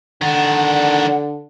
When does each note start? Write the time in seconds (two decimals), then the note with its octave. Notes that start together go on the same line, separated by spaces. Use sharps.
0.22 D3 D#3 D4 F#5